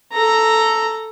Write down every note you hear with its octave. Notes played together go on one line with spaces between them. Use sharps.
A4 A#5